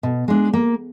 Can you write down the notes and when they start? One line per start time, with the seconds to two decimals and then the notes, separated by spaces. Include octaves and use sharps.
0.03 B2
0.28 G#3 D4
0.53 A#3